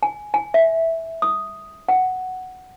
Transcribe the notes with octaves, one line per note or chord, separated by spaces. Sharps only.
G#5
G#5
E5
D#6
F#5